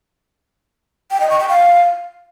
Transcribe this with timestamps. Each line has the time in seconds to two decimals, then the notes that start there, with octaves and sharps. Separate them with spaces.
1.11 G5
1.20 D#5
1.30 C#6
1.39 G5
1.49 F5